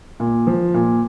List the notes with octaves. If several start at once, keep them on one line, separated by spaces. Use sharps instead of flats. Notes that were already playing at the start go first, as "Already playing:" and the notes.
A#2
F3
A#2